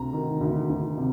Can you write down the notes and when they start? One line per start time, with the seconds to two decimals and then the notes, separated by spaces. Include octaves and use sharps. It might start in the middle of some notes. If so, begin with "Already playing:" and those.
Already playing: D2 C3 A#5
0.13 D#3
0.41 D2
0.69 D2
0.98 C3